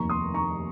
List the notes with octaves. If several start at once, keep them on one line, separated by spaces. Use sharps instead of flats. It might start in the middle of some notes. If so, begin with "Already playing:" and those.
Already playing: F1 D#2 D#3 A#5 C#6
C6 D#6
A#5 C#6